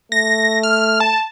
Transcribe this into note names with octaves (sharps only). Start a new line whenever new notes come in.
A3 A#6
F6
A5